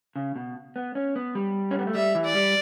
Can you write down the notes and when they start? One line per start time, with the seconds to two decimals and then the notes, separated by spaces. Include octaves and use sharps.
0.16 C#3
0.36 B2
0.76 B3
0.95 C#4
1.16 B3
1.35 G3
1.71 C#4
1.79 B3
1.87 A3
1.95 G3 E5
2.15 E3
2.24 D5
2.35 G3